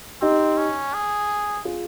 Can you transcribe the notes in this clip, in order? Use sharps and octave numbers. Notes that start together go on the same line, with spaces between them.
C4 D#4 G4
C#4
G#4
F4 G#4